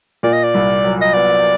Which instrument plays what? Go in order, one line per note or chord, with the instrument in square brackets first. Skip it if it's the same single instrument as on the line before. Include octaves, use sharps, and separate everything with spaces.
[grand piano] A#2 [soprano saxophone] D5
[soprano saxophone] D#5
D5
[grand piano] C2
F#3
[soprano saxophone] D#5
[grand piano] B3 [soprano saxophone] D5